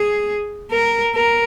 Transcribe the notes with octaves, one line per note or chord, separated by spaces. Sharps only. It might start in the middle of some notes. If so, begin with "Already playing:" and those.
Already playing: G#4
A#4
A#4